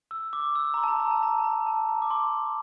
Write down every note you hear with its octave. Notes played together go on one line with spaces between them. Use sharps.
E6
D6
E6
A#5
C6
A5
A#5
A#5
A5
A#5
A5
A#5
A5
A#5
D6
C6